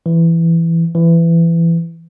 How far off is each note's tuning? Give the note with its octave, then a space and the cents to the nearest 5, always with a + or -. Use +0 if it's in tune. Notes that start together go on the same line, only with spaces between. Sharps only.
E3 +10
E3 +20